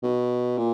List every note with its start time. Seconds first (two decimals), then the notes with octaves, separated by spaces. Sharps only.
0.03 B2
0.58 A#2